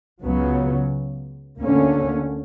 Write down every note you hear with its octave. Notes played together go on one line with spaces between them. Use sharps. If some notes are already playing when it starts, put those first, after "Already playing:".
C#2 C#3 F#3 B3
D2 D3 A#3 C#4